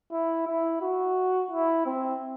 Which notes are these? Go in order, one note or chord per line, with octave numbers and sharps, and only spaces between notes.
E4
E4
F#4
E4
C4